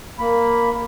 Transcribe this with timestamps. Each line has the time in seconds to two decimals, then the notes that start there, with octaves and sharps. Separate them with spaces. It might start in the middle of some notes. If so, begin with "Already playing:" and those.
0.19 A#3 B5